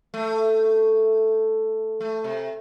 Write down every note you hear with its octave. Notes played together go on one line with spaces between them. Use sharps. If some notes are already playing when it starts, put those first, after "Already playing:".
A3
A3
C3